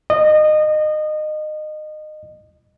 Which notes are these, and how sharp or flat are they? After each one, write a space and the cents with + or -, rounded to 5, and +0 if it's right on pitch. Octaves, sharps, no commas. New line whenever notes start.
D#5 -25